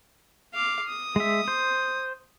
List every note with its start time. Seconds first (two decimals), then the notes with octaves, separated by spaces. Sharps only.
0.54 F5 D6
0.88 D#6
1.16 G#3 E5
1.48 C5